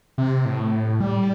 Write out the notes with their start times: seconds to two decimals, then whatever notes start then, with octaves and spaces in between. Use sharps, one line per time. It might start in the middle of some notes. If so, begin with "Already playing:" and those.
0.18 C3
0.45 A2
1.00 G3